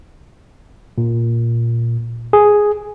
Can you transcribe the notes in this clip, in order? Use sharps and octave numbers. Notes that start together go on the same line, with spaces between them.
A#2
G#4